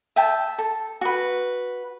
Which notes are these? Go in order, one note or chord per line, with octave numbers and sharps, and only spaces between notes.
E5 G5 A5
A4
F#4 B4